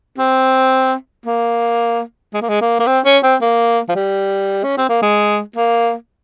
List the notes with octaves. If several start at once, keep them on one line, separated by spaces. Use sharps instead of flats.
C4
A#3
G#3
A#3
G#3
A#3
A#3
C4
C#4
C4
A#3
F3
G3
C#4
C4
A#3
G#3
A#3